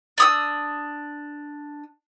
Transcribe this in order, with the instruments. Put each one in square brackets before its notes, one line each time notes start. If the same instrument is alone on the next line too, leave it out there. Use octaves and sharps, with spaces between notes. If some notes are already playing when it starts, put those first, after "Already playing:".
[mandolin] D4 D#6 E6